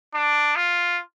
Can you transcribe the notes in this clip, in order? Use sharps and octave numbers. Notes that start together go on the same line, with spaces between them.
D4
F4